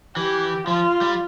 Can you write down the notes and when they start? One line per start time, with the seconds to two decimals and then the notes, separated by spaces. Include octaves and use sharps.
0.17 E3 G4
0.67 F3 F4
1.01 G3